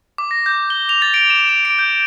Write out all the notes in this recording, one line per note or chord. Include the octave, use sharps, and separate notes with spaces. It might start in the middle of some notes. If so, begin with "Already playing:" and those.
D6
A#6
G6
G7
F7
A6
D7
E7
F7
D7
G6